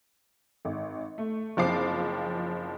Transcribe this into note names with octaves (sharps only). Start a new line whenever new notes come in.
G#1
A3
F#1 F3 C4 D6 C7